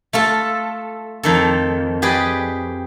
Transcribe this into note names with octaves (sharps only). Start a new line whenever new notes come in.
A3 F4 A4
F2 D#3 A4
G4 G#4 B4 D5 D#5 G5